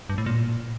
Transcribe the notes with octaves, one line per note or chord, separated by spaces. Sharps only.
G2
A2
A#2